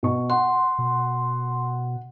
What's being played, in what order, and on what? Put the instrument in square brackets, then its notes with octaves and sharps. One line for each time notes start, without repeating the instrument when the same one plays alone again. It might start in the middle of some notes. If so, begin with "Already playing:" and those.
[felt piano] B2 C#6
[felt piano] F#5 [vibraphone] C6
[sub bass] B2